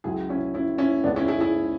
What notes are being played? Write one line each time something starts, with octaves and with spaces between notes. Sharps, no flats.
C#2 C#3 F#3 E4 G#4
C#4 E4
C#4 E4
C#4 E4
C#2 C#3 G#3 B3 D4
C#4 E4
E4 G#4
E4 G#4